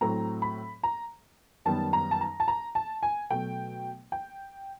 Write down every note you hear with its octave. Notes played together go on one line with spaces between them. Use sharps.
A2 F#3 A3 C4 A#5
B5
A#5
F#2 D#3 G3 B3 A5
A#5
A5
A#5
A5
A#5
A5
G#5
B2 F#3 A3 G5
G5